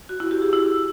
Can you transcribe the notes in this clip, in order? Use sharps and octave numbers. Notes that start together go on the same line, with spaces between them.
F#4
E4
G4
G#4
E4